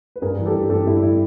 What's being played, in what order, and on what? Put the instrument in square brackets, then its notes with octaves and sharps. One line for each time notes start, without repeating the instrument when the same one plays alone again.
[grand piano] B4
G2 G#4 A#4
E3
G4 A4
G2
G2 G4 A4
G2 E4
E4